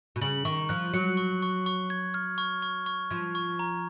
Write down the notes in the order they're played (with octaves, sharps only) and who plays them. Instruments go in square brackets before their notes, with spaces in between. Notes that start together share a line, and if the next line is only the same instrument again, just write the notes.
[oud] B2
[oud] C#3 [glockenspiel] F#7
[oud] D#3 [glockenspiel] C#6
[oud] F3 [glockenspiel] F#6
[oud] F#3 [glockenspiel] C#7
[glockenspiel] C#6
C#6
C#6
G#6
F6
C#6
C#6
C#6
[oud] F3 [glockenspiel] G#6
[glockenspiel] C#6
A#5